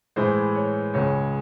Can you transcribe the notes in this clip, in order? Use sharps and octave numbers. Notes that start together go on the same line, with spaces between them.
A2 E3 G#3 C5
C#5
C#2 C#3 G#3 C#5